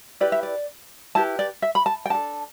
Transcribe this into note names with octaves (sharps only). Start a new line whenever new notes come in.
E4 G4 B4 D5
E5
D5
E4 G4 B4 A5
D5
E5
B5
A5
G5
D4 A4 A5